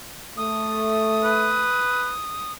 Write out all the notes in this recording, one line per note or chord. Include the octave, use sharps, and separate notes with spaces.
A3 D#6
B4